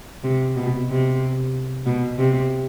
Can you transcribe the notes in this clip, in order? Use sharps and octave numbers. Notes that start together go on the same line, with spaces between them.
C3
B2
C3
B2
C3